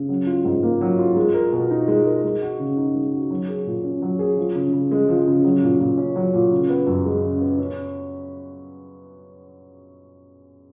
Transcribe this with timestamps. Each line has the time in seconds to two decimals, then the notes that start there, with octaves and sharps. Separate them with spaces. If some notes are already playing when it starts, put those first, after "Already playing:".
Already playing: C#3
0.09 F#3
0.27 F4
0.45 G#2
0.63 A#3
0.81 F#3
0.99 F4
1.16 G#3
1.34 A#4
1.52 B2
1.70 D#4
1.88 G#3
2.06 A#4
2.24 G#3
2.42 F#4
2.60 C#3
2.77 D#4
2.95 G#3
3.12 F#4
3.31 F#3
3.49 G#4
3.66 A#2
3.84 C#4
4.02 F#3
4.19 G#4
4.38 F3
4.55 C#3
4.73 C#3
4.91 G#3
5.08 F3
5.27 C#3
5.44 F#3
5.63 A#2
5.80 A#2
5.98 C#4
6.16 F#3
6.34 A#2
6.51 C#3
6.69 B3
6.87 F#2
7.06 G#3
7.24 C#3
7.41 B3
7.58 C#4